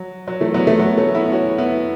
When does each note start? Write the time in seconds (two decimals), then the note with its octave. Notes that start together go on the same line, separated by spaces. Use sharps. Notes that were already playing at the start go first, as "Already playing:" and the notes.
Already playing: F#3
0.28 F#3
0.40 E3 A3
0.54 F#3 B3
0.67 E3 A3
0.79 F#3 B3
0.97 A3 C#4
1.15 B3 E4
1.32 C#4 F#4
1.58 B3 E4